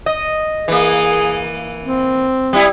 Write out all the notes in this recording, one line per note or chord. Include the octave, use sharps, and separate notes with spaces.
D#5
E3 A#3 G#4
C4
G3 E4